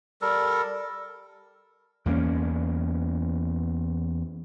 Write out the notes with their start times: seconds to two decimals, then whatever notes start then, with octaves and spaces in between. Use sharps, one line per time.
0.21 G3 A4 A#4
2.06 E2 A#3 B3 C#4